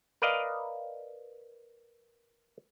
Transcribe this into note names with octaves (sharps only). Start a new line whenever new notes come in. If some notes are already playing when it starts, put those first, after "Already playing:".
A#4 B4 D5 D#5 F5